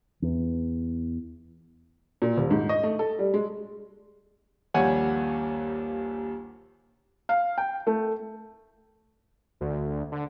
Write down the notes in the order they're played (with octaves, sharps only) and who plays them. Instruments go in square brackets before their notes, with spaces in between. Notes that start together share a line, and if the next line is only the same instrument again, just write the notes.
[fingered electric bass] E2
[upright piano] A#2
D#1
G#2
D#5
A3
A4
G3
G#3
[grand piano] A#1 D#2 G3 C#5 F#5 G#5
[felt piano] F5
G5
A3
[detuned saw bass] D2
D3